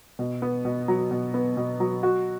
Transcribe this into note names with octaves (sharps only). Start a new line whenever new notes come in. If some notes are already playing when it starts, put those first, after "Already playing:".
B2
B3
B2
F#3
B2
B3
B2
F#3
F#4